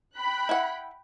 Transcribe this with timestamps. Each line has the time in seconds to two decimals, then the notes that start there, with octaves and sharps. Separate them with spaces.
0.16 G5 B5 F#6
0.49 E4 F#5